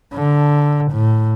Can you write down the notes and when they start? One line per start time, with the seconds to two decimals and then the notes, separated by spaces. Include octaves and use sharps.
0.14 D3
0.92 A2